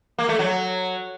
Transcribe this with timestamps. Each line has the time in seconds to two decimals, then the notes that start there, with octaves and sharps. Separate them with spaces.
0.18 A#3
0.29 A3
0.39 F#3